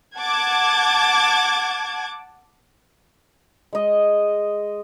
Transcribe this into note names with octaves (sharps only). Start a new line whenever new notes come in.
F#5 A5 D6 G#6
G#3 D#5